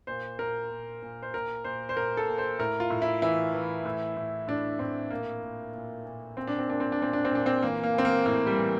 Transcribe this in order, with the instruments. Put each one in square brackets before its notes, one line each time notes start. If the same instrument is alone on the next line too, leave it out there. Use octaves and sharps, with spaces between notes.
[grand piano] A#2 C5
A#2 A#4
A#2
A#2
C5
A#2 A#4
A#2 C5
C5
A#2 A#4
A4
A#2
C5
A2 A#4
F4
A2
E4
E3 E4
E3
A2
A2
A2 D4
A2 C4
A#2 A#3
A#2
A#2
A#2
A#2 C4
D4
C4
A#2 D4
C4
D4
A#2 C4
D4
C4
A#2 D4
C4
E3 A#3
A#3
E3 C4
A#3
A2 A#3
G3
E3